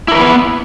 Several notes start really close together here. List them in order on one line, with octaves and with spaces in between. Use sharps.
E4 A#4 B4 B3